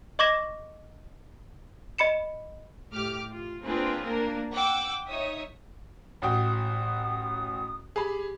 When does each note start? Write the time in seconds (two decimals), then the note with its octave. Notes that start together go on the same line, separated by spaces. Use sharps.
0.19 D#5 C#6 D6 G#6 A#6 E7
1.98 D#5 B5 C#7 E7
2.92 A2 G4 D6 F6
3.30 F4
3.63 A#3 C4 D4 F4 G#4 B4
4.03 A#3 D4 A#4
4.53 F#5 G5 D6 E6
5.08 D#4 C#5 E5 D#6
6.22 A1 F#4 G5 D#6
7.96 G4 G#4 B5